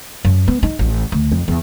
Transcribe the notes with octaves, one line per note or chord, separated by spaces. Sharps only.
F#2
B3
D#4
A1
D2
F2
E2